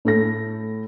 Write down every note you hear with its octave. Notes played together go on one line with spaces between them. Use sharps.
A2 A3 A#6